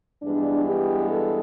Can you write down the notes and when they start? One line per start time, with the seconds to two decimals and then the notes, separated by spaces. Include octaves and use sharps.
0.22 G2 E3 G#3 B3 D4
0.66 G4
1.10 A4